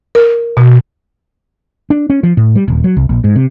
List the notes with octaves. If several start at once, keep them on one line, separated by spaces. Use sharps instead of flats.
A#4
B2
D4
C#4
F3
A2
G3
D#1
F#3
C2
A#1
G#2
C3